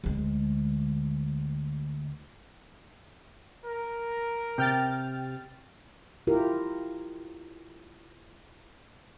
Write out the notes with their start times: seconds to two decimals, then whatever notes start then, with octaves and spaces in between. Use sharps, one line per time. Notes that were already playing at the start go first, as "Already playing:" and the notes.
0.04 D2 G#3
3.66 A#4
4.58 C3 G5 F6 A6
6.27 E4 F4 G4 A#4